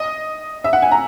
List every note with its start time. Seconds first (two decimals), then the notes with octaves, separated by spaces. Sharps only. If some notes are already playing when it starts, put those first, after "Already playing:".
Already playing: D#5
0.64 E5
0.73 F#5
0.82 G#5
0.91 A#5